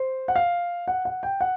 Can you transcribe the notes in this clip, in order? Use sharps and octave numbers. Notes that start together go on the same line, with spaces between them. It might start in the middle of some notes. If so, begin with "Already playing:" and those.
Already playing: C5
F#5
F5
F#5
F#5
G5
F#5